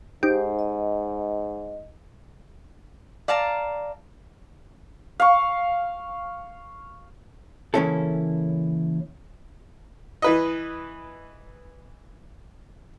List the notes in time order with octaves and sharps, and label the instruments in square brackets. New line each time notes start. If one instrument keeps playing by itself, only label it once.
[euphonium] G#2 [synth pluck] D#4 G4 [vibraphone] C5
[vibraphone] D#5
[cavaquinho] D5 F5 A5 A#5
[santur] F5 C#6
[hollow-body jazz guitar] C#3 E3 A#3 C#4 E4 A4
[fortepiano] E3 B4 D#5